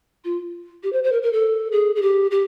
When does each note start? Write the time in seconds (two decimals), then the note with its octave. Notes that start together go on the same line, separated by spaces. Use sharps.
0.24 F4
0.83 G4
0.93 C5
1.04 C5
1.12 A#4
1.22 A#4
1.33 A4
1.72 G#4
1.96 G#4
2.02 G4
2.31 G4